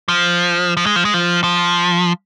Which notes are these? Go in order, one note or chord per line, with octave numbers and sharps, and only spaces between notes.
F3
F3
G#3
F3
G#3
F3
F3